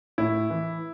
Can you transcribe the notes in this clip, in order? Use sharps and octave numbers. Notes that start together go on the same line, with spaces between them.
A2 E4
E3